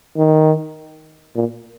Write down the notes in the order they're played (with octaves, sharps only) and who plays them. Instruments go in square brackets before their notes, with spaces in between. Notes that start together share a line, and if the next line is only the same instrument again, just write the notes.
[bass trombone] D#3
A#2